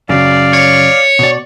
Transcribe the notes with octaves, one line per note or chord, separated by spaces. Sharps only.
F#2 C#3 D5 F5
C#5
B2 D5